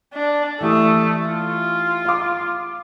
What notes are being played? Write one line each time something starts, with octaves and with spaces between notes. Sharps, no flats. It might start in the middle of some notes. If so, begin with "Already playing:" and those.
D4
E3 A3 G4 D#6
F4
F5 D6